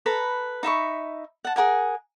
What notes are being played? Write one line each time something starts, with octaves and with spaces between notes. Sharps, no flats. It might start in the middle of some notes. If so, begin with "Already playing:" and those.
A4 B4 A#5 B5
D#4 E5 B5 C#6
F#5 A5
G#4 A#4 F#5 G#5